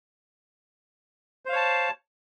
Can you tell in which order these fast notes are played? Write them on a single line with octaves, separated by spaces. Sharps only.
C5 F5 C#5 A5